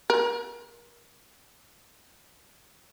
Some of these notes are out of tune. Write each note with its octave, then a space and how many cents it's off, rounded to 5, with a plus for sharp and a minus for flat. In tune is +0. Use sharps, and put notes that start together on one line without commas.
A#4 +35